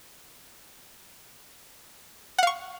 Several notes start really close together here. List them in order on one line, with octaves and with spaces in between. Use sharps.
F#5 F5 C#6